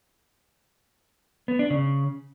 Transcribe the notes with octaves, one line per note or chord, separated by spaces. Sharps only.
B3
D4
C#3